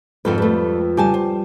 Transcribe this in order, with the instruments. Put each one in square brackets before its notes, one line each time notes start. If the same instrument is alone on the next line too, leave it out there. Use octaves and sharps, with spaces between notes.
[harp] F2 G#2 [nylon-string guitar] D3 A4 B4
[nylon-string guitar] G3 A3 [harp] A4 B4
[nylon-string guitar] C#3 G#5 A5 [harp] G3 G4
[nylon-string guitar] C5